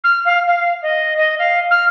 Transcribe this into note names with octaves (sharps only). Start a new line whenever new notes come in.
F6
F5
F5
D#5
D#5
F5
F6